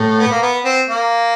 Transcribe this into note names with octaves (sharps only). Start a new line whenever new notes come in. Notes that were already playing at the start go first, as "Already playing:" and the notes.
Already playing: A2
B3
A#3
B3
C4
A#3